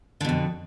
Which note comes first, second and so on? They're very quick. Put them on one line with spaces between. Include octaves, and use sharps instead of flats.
D3 B2 F2